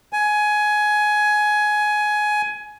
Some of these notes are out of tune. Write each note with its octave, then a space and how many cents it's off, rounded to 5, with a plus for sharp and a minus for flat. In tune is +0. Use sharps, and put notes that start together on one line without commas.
G#5 +15